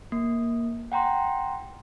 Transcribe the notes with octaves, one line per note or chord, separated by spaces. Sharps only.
A#3
F#5 G5 A#5 C6